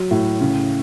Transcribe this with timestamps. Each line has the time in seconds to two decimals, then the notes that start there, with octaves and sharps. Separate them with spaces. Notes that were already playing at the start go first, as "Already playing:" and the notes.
Already playing: F#3
0.11 A2
0.41 C#3